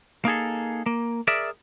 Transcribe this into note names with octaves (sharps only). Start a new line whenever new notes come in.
A#3 D#4 G#4 A4
A#3
G#4 A#4 D5 E5